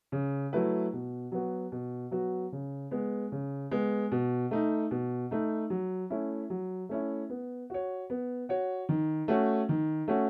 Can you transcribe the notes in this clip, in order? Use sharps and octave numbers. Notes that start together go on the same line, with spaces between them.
C#3
F#3 A3 E4 B4
B2
F#3 B3 F#4
B2
F#3 B3 F#4
C#3
G#3 B3
C#3
G#3 B3
B2
A3 D#4
B2
A3 D#4
F#3
A3 C#4 E4
F#3
A3 C#4 E4
B3
F#4 C#5
B3
F#4 C#5
D#3
A3 C#4 F#4
D#3
A3 C#4 F#4